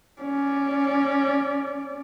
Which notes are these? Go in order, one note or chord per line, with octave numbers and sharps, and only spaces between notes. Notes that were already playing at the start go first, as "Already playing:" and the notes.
C#4 D5